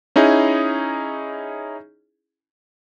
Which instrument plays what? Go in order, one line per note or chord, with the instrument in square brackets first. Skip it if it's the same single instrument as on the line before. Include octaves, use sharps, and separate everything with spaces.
[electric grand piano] C#4 D#4 E4 G#4